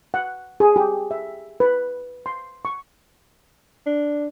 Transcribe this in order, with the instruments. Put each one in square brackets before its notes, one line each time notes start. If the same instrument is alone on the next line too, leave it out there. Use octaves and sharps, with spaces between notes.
[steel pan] F#5
G#4
G4
E5
B4
C6
C#6
[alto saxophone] D4